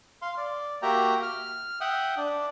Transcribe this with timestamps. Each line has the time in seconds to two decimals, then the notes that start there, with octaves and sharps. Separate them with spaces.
0.22 F5 C6
0.37 D5
0.82 A#3 F#4 G4 E5 G5 A#5
1.23 F6
1.81 E5 F#5 G5 D#6
2.17 D4